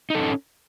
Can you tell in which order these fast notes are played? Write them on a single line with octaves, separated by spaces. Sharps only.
D#4 A4 C#4